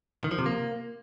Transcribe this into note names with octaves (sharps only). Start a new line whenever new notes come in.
D#3
F3
C3
A#3